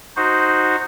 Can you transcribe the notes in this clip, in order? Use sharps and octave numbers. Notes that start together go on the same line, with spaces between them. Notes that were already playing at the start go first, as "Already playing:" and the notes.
D#4 F#4 C5